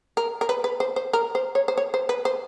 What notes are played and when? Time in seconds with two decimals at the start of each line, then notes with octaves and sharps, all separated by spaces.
0.17 A#4
0.41 A#4
0.49 B4
0.64 B4
0.80 C5
0.96 C5
1.13 A#4
1.35 C5
1.55 C#5
1.68 C5
1.77 C#5
1.94 C5
2.09 B4
2.25 C5